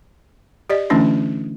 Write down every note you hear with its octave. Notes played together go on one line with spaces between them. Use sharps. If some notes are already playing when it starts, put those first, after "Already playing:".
G4 D5 D#5
D3 E3 A3 C#4 D4 E4